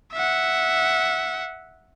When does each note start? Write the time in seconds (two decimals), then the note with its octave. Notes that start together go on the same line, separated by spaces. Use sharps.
0.13 E5 F#5